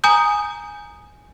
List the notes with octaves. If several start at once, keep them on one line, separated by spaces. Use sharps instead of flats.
G#5 A#5 D#6 G6